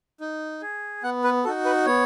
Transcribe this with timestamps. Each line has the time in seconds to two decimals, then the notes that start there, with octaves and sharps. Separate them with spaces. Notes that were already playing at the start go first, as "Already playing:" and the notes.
0.20 D#4
0.62 G#4
1.03 B3 F#5
1.24 B4
1.44 D#4 F#4 A4
1.65 B4
1.86 B3 C#5